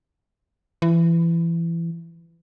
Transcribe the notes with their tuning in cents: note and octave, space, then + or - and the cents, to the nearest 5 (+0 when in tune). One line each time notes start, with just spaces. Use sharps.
E3 +25